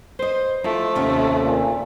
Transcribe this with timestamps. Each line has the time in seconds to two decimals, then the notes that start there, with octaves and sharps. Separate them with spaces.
0.19 B4 C5 D#5
0.64 F3 A3 E4
0.95 D#2 C3 C#4
1.44 A#2